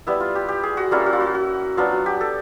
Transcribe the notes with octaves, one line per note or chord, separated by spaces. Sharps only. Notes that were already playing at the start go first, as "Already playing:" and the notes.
G3 B3 E4
F4
G4
G4
G#4
F#4
G3 A#3 C#4 E4 F4
F#4
F4
F#4
F#4
F#3 B3 D4 F4
F#4
G4
A4